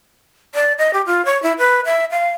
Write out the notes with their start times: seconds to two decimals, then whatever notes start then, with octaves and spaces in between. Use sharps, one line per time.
0.55 D5
0.78 D#5
0.93 G4
1.06 F4
1.25 C#5
1.43 E4
1.58 B4
1.85 E5
2.11 F5